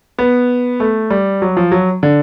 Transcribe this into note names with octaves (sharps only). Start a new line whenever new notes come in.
B3
A3
G3
F#3
F3
F#3
D3